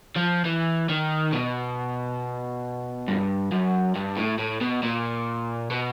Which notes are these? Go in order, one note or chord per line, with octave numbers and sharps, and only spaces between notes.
F3
E3
D#3
B2
G2
F#2
G2
A2
A2
B2
A#2
B2